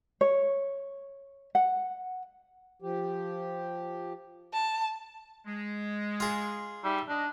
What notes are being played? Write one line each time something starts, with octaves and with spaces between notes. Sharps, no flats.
C#5
F#5
F3 G4
A5
G#3
F4 G#4
G3 D#4 E5
D4 D#5